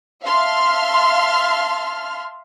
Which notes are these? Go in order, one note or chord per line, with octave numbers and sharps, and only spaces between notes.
E5 F5 A5 C6 F6